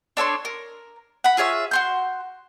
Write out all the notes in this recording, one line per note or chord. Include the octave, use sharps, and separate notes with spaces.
D4 A4 C#5 C6
A#4
F#5 B5
F4 G#4 C#5 E5
F#4 C6 G6